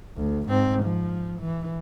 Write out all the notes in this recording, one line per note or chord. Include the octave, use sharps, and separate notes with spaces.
D2
G#2 C4
F3
E3